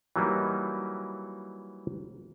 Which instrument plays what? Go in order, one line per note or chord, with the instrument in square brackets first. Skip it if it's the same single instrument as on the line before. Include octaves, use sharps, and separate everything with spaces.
[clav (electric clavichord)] E3 F#3 G3 A#3 D#4 E4